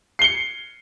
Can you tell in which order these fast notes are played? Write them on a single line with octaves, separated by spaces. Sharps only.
C7 G7 C#7